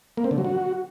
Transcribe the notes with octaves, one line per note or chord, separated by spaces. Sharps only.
A#3
C4
D3
F#3
F#4